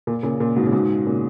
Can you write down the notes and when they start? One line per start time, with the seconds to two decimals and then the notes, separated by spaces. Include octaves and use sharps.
0.07 A#2
0.23 A#2 C#3
0.40 A#2
0.56 G#2 B2
0.66 C#3
0.72 G#2 B2
1.06 A#2 C#3